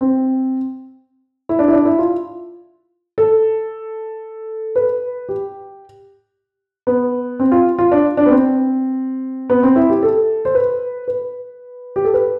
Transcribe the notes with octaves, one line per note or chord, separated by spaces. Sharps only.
C4
E4
D4
E4
D4
E4
F4
A4
B4
G4
B3
C4
F4
F4
D4
D4
B3
C4
B3
C4
E4
G4
A4
C5
B4
B4
G4
A4
B4